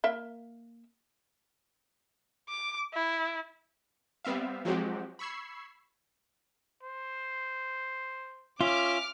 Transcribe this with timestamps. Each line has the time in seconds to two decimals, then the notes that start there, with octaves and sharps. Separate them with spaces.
0.04 A#3 E5
2.49 D6
2.94 E4
4.25 G3 B3 C4 E5 F5
4.65 F3 F#3 G#3 C4 F#4 G4
5.19 B5 C#6 E6 G#6 C7
6.84 C5
8.61 C#4 F4 E5 D6 F6